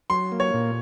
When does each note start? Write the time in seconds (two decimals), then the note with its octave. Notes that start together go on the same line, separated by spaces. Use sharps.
0.10 F#3 C6
0.32 A#3
0.40 C#5
0.54 A#2